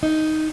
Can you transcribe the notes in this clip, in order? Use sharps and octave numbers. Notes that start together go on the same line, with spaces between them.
D#4